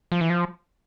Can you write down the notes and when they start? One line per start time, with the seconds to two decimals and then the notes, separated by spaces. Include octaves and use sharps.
0.12 F3
0.21 E3
0.30 F3